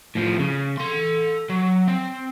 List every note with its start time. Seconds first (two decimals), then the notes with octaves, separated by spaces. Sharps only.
0.15 A2 F3
0.40 C#3
0.78 A4 C6
1.50 F#3
1.88 C4